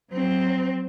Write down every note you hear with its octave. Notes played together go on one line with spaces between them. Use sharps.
F#3 C4